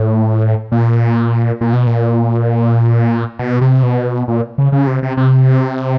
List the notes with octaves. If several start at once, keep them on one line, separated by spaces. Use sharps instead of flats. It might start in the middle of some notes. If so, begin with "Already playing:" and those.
Already playing: A2
A#2
A#2
B2
A#2
B2
C3
B2
A#2
C#3
C#3
C3
C3
C3